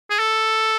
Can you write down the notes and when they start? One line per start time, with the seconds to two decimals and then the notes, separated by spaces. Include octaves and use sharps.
0.10 G#4
0.19 A4